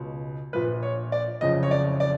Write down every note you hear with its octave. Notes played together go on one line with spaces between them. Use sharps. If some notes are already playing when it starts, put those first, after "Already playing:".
Already playing: C#2 B2
A#1 A#2 F3 B4
C#5
D5
F#1 F2 C#3 F3 D#5
C#5
D5
D5